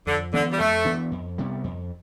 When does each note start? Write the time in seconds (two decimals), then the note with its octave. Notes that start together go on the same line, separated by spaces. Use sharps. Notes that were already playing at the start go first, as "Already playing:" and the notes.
0.07 F2 D3
0.33 D3 E3 B3 D4
0.51 G3
0.59 F2 A3
0.85 E3 B3 D4
1.12 F2
1.38 C3 G3 B3
1.64 F2